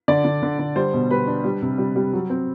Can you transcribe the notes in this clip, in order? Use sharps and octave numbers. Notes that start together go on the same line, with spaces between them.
D3 D5
D3
D3
D3
G3 C5
B2
G3 B4
D4
G3
C3
G3
G3
F#3
C4